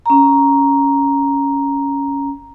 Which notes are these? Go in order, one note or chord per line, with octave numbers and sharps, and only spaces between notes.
C#4 A#5